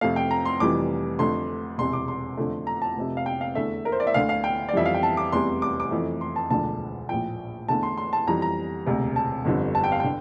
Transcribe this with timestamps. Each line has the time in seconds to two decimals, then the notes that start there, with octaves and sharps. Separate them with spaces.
0.01 F2 C3 F3 A3 F5
0.16 G5
0.31 A#5
0.45 C6
0.60 F1 F2 E3 G3 D6
1.19 F2 D3 A3 C6
1.78 E1 E2 C3 C6
1.93 D6
2.08 C6
2.37 F2 D3 F3 A3
2.67 A#5
2.82 A5
2.96 F1 F2 C3
3.17 F5
3.26 G5
3.41 F5
3.55 E2 D3 A3 E5
3.85 A#4
3.92 C5
4.00 D5
4.07 E5
4.14 D2 D3 A3 F5
4.29 F5
4.44 G5
4.69 D5
4.73 F2 E3 G3 E5
4.86 F5
4.94 G5
5.03 A5
5.17 D6
5.32 F1 E2 C3 G3 C6
5.62 D6
5.80 D6
5.91 F2 E3 A3
6.21 C6
6.36 A5
6.50 E1 D2 D3 F3 A5
7.09 A#1 A2 F3 G5
7.68 E2 D3 A3 A5
7.83 C6
7.98 C6
8.13 A5
8.27 F2 E3 G3 A#5
8.42 A#5
8.86 E1 D2 C3
9.16 A5
9.45 G1 F2 D3 G3
9.75 A5
9.84 G5
9.92 F5
10.00 D3 G5